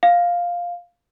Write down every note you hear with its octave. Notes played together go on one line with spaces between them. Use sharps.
F5